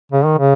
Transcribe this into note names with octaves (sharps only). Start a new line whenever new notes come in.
C#3
D#3
C#3